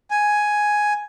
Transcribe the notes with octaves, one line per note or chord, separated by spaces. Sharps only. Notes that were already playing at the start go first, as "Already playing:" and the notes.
G#5